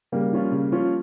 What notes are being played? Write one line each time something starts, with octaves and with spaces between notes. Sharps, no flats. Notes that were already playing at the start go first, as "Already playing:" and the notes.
C#3 G3 A#3
F3 C#4 F4
C#3
F3 C#4 F4